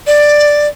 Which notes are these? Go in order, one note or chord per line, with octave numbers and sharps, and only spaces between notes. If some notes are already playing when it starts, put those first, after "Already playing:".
D5